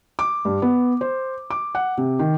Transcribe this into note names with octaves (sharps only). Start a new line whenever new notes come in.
D6
G2
B3
C5
D6
F#5
C3
D#3